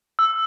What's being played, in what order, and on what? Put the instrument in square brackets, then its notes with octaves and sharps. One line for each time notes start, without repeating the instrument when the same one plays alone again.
[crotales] E6